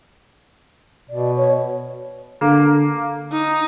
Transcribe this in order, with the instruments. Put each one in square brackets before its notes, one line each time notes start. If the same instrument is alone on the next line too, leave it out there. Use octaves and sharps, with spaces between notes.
[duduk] B2 [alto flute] D5
[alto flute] C#5
[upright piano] D3 [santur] A#3
[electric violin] D#4